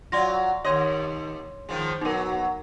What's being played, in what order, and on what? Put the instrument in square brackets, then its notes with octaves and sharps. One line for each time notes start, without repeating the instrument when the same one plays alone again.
[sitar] F#3 F4 [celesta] D5 C6 A#6
[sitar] D#2 D#5 [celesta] C#5 C6 G#6
[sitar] D#3 F3 G#3
[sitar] B2 F#3 [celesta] D#4 A#4